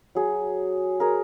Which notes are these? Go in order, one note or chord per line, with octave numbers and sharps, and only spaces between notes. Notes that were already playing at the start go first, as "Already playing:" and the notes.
F#3 G#4
G#4 A#4